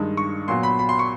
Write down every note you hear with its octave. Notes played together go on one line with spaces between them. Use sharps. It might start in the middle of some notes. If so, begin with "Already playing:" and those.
Already playing: G2 D#3 G#3
C#6
A#2 F#3 B3 C6
B5
B5
C6
C#6